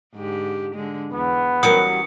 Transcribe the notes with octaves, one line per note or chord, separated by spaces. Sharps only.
G#2 D3 G4
D3 G#3
E2 B3
E3 F#3 G3 C#4 A#4 D#6 C#7